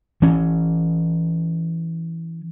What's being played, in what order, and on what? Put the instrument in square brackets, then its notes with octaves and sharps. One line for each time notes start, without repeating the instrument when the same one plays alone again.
[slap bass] E3 C#4